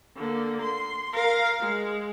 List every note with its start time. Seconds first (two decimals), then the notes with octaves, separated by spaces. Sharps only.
0.16 D3 A#3
0.61 C6
1.13 A#4 F5
1.60 G#3